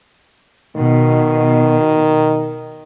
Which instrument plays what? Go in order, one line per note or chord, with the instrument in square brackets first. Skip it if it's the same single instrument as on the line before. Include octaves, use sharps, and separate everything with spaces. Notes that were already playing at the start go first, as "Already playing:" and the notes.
[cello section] B2 [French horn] D#3